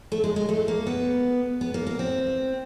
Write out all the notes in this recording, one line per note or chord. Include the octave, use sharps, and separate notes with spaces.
A3
G#3
G#3
A3
A#3
B3
B3
A#3
A#3
C4